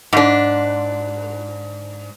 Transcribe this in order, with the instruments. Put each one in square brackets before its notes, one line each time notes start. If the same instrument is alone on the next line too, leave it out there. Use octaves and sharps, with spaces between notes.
[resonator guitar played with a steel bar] G#2 D4